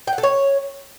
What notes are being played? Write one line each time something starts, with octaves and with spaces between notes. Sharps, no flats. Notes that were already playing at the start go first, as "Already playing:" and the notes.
G5
F#5
A4
C#5